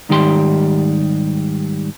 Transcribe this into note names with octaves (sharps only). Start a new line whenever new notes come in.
G#2 D#3 G3 G4 A4 C6